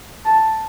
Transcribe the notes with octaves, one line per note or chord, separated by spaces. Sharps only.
A5